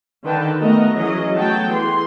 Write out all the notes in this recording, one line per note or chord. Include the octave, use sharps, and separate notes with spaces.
D3 D#3 B4 G5 A5
A3 B3 F#4 A#4 D#5 A#5
E3 F#3 C#4 G#4 D#5
F#3 A3 B3 C#5 G5 A5
E3 G#4 C6